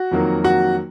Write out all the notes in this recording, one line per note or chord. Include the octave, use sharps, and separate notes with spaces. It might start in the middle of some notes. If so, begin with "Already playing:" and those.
Already playing: F#4
F2 D#3 F#3 A#3
F#4